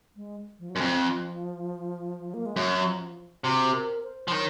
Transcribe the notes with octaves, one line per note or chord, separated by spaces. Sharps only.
G#3
F3
F#3
F#2
F2 F3
A#3
G#3
F#2 F#3
F3
C3 F#4
A#4
C5
F3
D#3 C#5